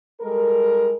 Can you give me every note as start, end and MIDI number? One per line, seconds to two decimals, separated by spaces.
0.21 0.95 55
0.21 0.95 56
0.21 0.95 69
0.21 0.95 70